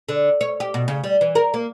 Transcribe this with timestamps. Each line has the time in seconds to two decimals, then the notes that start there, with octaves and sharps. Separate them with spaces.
0.09 D3
0.41 C#5
0.60 G4
0.74 B2
0.88 C#3
1.04 G3
1.21 E3
1.35 A#4
1.54 A#3